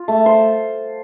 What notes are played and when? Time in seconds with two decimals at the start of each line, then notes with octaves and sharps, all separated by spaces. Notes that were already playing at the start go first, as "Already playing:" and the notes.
Already playing: F4
0.08 A3
0.26 C5